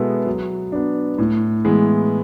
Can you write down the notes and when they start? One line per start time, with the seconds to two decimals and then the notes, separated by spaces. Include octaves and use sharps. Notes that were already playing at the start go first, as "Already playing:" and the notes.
Already playing: B2 G#3 B3 E4 A4
0.26 F#3
0.72 B3 D4
1.18 A2
1.65 E3 G#3 B3